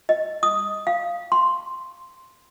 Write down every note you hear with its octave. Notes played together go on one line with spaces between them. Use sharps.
D#5
D#6
F5
C6